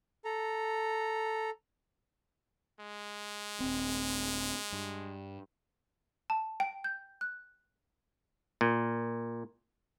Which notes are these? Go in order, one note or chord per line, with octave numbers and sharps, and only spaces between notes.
A4 A#5
G#3
D#1 C4
G2
A5
G5
G6
F#6
A#2